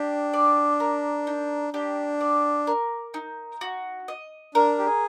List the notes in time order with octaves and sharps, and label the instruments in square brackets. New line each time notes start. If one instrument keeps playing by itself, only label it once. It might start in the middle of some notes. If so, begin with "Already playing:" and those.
Already playing: [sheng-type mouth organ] D4 [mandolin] G4
[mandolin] D5
A#4
D#4
[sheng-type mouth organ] D4 [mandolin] G4
[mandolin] D5
A#4
D#4
F#4
D#5
[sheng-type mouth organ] D4 [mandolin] A#4
[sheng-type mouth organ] G4
G#4